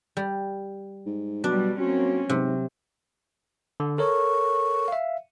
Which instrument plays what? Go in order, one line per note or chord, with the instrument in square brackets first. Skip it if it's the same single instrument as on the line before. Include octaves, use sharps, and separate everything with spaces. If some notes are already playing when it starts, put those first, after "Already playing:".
[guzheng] G3
[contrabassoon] G#2
[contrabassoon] B2 [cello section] F#3 G3 [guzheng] D4
[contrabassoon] F#3 [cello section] A#3 C4 C#4
[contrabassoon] G#2 [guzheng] C3 [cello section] F#3
[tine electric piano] D3
[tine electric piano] A4 A#4 C#5 [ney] C#6
[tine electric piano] E5 F5